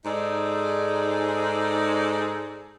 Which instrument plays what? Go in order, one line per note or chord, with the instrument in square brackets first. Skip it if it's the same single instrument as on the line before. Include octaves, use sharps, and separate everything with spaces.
[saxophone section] G#2 D#4 G#4 A4 D5